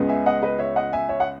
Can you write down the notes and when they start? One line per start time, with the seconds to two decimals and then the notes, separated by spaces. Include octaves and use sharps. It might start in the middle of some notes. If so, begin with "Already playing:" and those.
Already playing: C#2 C#3 G#3 B3
0.09 E5 G#5
0.26 D#5 F#5
0.42 B4 D#5
0.59 C#5 E5
0.76 D#5 F#5
0.93 E5 G#5
1.09 C#5 E5
1.20 F#5